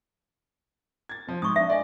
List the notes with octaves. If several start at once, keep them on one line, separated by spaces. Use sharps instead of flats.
G#6 A6
F3 C4
G#2 C#6 D#6
D4 E5
D5 D#5 G#5